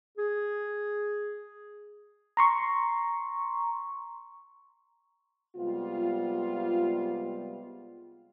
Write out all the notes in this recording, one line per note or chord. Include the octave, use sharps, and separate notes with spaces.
G#4
A#5 C6 C#6
C3 G3 G#3 B3 F4